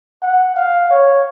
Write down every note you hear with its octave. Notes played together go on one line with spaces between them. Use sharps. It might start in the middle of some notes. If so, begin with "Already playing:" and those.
F#5
F5
C#5